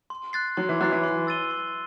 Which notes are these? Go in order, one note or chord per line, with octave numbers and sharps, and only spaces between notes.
C6
F#6 A6 C7
F#3 C6
E3
F#3 F#6 A6 C7
E3
C6
E6 A6 D#7 G7
C6